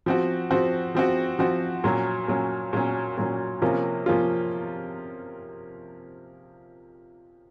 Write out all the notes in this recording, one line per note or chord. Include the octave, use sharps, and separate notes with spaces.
F3 C4 F#4
F3 C4 F#4
F3 C4 F#4
F3 C4 F#4
A#2 F#3 C#4
A#2 F#3 C#4
A#2 F#3 C#4
A#2 F#3 C#4
C3 F3 A#3 C#4 F4
C3 F3 A#3 C#4 F4